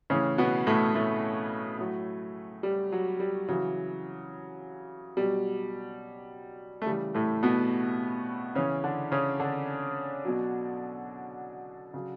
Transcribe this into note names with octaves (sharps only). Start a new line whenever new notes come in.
A2 C#3 E3 C#4
B2 B3
A2 A3
A2 A3
A2 F#3
G3
F#3
G3
C#3 E3 F#3
B2 F#3 G3
A3
C#3 E3 G3
A2 A3
B2 B3
C#3 E3 C#4
D3 D4
C#3 C#4
D3 D4
B2 F#3
C#3 F#3